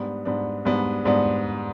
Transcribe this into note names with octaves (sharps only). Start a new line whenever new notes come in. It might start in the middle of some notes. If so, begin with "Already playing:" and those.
Already playing: G#2 G3 B3 D4
G#2 G3 B3 D4
G#2 G3 B3 D4
G#2 G3 B3 D4